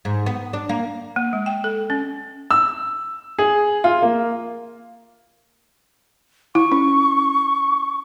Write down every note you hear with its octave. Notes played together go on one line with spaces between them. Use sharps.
G#2
B3
D4
A#3
A#3
G#3
G5
A4
C#4
E6
G#4
F4
A#3
E4 C#6
C#4